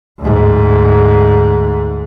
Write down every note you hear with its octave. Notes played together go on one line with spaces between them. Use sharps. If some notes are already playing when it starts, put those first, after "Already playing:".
D2 G#2